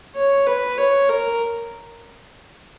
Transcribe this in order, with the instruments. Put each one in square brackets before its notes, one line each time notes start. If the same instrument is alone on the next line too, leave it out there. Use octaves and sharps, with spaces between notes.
[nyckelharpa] C#5
B4
C#5
A#4